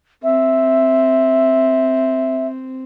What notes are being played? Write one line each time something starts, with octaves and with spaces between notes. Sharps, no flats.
C4 E5